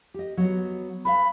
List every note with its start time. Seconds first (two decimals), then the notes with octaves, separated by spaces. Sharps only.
0.14 G4 D#5
0.37 F#3 B3
1.05 B4 E5 F5 B5